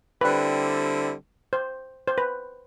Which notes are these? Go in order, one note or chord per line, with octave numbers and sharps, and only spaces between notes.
D3 G3 C4 E4 B4
C5
C5
B4